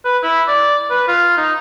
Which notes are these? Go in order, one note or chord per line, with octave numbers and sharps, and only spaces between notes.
B4
E4
D5
B4
F4
D#4